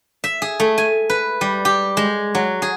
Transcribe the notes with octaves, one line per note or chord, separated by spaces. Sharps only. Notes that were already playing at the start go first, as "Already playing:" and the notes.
E5
G#4
A3
G#5
B4
G3
G4
G#3
F#3
G#4